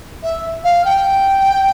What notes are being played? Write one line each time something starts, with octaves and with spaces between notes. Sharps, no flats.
E5
F5
G5